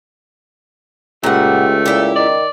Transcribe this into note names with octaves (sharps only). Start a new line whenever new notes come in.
C#2 A#2 A3 G4 F#5
A#2 E4 G4
D#3 D5